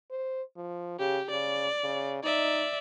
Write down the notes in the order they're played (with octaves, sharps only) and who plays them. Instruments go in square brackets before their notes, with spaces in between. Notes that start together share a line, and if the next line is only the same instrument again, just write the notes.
[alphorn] C5
F3
[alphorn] C#3 [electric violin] G4
[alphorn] C#3 [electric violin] D5
[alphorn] C#3
[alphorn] D#4 [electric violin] D5 E5